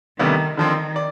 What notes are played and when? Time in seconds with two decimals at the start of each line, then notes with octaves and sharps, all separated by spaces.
0.19 D2 C3 D#3 G3 B3
0.57 D3 D#3 F3 C4
0.96 D5